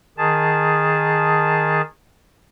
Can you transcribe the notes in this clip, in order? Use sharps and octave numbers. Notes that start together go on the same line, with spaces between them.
D#3 G#4 A5